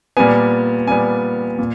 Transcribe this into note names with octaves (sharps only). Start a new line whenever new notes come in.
A#2 G3 B3 G#5
A#2 G3 B3 G#5
A#2